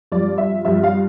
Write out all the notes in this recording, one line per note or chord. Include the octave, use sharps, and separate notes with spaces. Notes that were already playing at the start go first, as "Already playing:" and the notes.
G2 F3 D5
E5
G2 F3 E5
F5